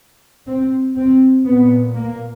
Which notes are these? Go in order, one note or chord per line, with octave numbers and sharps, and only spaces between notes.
C4
C4
A#2 B3
A#3